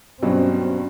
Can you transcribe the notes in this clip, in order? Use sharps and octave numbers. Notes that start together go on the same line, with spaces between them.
G2 B2 F#3 C4 C#4